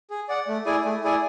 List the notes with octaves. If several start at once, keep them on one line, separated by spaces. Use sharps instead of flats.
G#4
D5 F#5
A3
E4 G#4 D5 G#5
A3
E4 G#4 D5 G#5